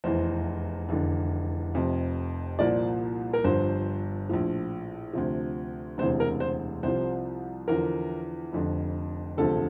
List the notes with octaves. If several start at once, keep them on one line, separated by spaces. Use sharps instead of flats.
F1 E2 E3 C5
F1 E2 D3
F1 F2 C3
C2 A#2 F3 D5
A#4
G1 G2 F3 C5
A#1 A2 F3
D2 C3 F3
E1 D2 C3 E3 C5
A#4
C5
C2 C3 F3 C5
E2 D3 F3 A#4
F1 F2 D3
E1 D2 C3 F3 A4